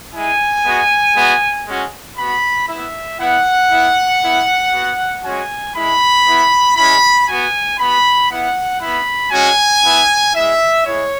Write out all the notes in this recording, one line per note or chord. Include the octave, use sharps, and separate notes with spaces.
G#3 E4 G#5
G#3 B3 F#4
G#3 B3 F#4
G#3 C#4 F#4
B3 F#4 B5
B3 E4 E5
B3 E4 F#5
B3 E4
B3 E4
B3 F#4
G#3 C#4 F#4 G#5
G#3 E4 B5
B3 E4
G#3 C#4 E4 B5
B3 F#4 G#5
B3 F#4 B5
B3 E4 F#5
B3 E4 B5
G#3 C#4 F#4 G#5
B3 E4
G#3 E4 E5
G#3 E4 C#5